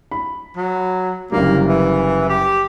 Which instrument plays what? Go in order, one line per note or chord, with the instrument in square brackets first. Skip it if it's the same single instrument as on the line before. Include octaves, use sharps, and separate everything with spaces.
[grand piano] B5
[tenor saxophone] F#3
[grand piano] F#1 D3 G3 [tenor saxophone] A#3
[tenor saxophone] E3
G4